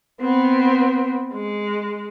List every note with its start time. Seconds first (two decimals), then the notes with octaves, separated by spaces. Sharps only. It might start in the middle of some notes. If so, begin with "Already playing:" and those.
0.21 B3 C4
1.33 G#3